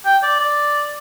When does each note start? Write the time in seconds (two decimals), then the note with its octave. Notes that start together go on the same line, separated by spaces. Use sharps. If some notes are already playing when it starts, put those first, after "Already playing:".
0.05 G5
0.23 D5
0.40 D5